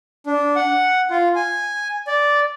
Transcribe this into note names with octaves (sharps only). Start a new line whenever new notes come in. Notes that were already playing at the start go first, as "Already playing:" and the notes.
D4
F#5
F4
G#5
D5